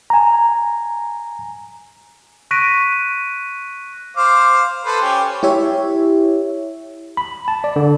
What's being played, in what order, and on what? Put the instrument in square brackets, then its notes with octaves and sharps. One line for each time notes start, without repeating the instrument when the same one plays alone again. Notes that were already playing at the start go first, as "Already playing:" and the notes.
[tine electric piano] G#5 A#5
[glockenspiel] C#6 F#6 A#6 B6 D7 D#7
[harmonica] C5 F5 D6
A4 B4 C5
C#4 G4
[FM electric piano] E4 G4 C#5 E5
[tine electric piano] B5
A5
D5
D3